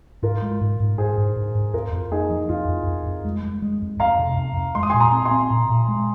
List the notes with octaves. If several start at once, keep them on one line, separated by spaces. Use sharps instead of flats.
G#2 F4 A#4
G#3
G#2
G#2
G#2 G#4 C5
G#2
G#2
G#2
F2 F4 A#4
F2
A#3 D#4 G#4
F3
F2 F4
F2
F2
F2
G#3
G#3
G#3
F2
F2 F5 A#5
C3
F2
F2
G#3 C6
D#6
G#5 C6
A#2
A#5 D#6
C4
G#5 C6
C4
A#2
A#2
G#3